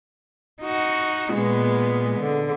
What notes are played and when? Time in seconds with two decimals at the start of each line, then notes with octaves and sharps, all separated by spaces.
0.63 D#4 F#4
1.33 A#2 G#3 B3
2.19 D3